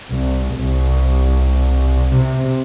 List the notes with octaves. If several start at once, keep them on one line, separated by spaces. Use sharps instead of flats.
C2
C2
C3